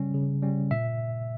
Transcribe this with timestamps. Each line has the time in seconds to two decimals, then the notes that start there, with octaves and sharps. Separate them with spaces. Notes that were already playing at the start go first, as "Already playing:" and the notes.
Already playing: C#3 G3 C#4
0.14 C#3
0.42 G3 C#4
0.71 A#2 E5